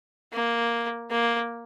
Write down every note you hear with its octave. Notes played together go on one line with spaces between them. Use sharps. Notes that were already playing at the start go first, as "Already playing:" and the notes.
A#3
A#3